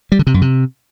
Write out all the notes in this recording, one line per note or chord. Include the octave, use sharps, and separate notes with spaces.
G3
D3
C3
F#2
C3